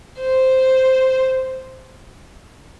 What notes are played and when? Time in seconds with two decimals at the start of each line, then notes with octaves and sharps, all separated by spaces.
0.20 C5